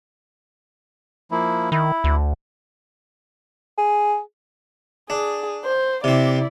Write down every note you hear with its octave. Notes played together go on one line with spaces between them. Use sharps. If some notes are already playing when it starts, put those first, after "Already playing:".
F3 A#3 E4
D#3 E4
D2
G#4
D4 G#4
C5
C3 C4 E4 D5